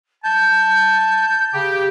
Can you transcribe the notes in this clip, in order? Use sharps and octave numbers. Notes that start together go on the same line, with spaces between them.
A5 G6
C#3 G4